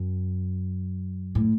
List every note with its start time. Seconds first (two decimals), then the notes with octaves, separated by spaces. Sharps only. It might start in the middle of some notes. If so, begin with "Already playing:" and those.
Already playing: F#2
1.35 A2